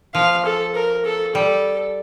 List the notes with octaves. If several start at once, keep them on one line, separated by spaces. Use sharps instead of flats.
F3 F5
A4
A#4
A4
G3 A4